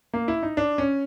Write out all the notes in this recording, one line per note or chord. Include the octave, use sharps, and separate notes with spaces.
A#3
E4
D#4
D4
C#4